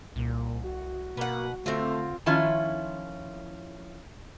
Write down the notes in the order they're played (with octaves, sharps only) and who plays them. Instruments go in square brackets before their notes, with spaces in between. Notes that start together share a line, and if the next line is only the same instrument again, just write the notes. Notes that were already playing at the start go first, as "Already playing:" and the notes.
[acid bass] C2 [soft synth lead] A#2
[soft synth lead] F#4
[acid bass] B2 [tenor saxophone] A#3 [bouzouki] B4 F#5
[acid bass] D3 [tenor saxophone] A3 [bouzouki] C4 F4
[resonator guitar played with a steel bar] D#3 F3 C#4 E4 F4